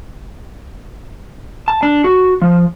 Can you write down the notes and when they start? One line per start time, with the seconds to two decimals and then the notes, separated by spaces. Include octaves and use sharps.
1.68 A5
1.83 D4
2.04 F#4
2.42 F3